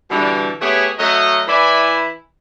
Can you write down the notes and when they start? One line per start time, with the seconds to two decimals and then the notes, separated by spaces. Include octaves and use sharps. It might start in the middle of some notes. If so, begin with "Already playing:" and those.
0.10 B2 D3 E3 G3
0.61 A3 B3 G4 G#4 C#5 G#5
0.98 F#3 A3 D#5
1.48 E3 E4 D5 G#5 B5